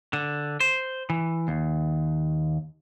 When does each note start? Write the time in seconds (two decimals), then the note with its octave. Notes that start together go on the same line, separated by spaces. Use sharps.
0.13 D3
0.60 C5
1.10 E3
1.48 D#2